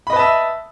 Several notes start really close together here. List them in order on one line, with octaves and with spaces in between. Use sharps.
B5 D#5 B4 A5 E5